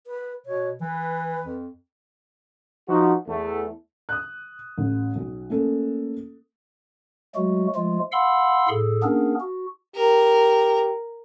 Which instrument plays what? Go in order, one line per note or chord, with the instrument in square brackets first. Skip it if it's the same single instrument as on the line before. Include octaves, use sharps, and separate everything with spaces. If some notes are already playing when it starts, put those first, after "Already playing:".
[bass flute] B4
[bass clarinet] B2 [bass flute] C#5
[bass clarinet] E3 [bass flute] B4
[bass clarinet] F2
[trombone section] F3 D#4 F#4
E2 A3
[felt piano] D#6 F#6
A1
B1 B2
A3 A#3 C#4 A4
[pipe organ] F#3 G#3 A3 F#4
F3 G#3 A3 F4
F5 F#5 B5 C6 E6
A2 G#4 A4
A#3 B3 C#4 D4 G#4 A#4
F#4
[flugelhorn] G4 [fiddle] A#4